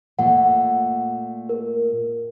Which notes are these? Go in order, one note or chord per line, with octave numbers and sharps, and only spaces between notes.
A#2 A3 F#5
A#4